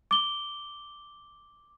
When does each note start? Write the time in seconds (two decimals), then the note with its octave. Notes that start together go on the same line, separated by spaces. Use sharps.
0.11 D6 G7